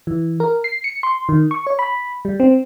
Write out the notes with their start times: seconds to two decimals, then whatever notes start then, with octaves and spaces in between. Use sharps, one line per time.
0.07 E3
0.40 A#4
0.64 C7
0.84 C#7
1.03 C6
1.29 D#3
1.51 C#6
1.67 C#5
1.79 B5
2.25 G3
2.40 C4